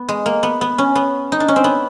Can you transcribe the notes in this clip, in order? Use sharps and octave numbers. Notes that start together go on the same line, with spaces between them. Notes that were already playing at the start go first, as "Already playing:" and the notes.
Already playing: B3
G#3
A#3
B3
B3
C#4
B3
D#4
D4
C#4
C4
B3